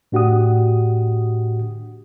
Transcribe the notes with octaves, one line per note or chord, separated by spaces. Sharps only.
A2 D4 F#4 G4 F#5 D#6